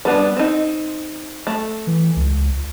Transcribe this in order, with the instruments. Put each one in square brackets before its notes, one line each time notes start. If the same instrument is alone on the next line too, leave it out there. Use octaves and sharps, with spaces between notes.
[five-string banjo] G3 B3 D4
C4 D#4
A3
[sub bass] E3
C#2